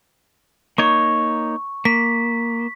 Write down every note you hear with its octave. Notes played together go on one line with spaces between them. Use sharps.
A#3 D#4 C#5 C#6
A#3 B6